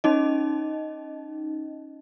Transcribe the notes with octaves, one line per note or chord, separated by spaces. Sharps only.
C#4 D#4 D#5